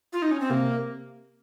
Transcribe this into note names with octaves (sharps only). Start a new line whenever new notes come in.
F4
D#4
C#4
C4
C3 A#3